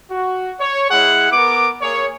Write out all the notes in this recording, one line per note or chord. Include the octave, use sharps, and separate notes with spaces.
F#4
C#5
G#3 E4 G#4 F#5
B3 A#4 D6
A#3 G#4 C#5